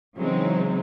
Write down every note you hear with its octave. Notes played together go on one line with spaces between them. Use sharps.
C#3 E3 F#3 G#3 C4 D#4